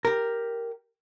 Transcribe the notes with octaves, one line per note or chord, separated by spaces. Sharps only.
G4 A#4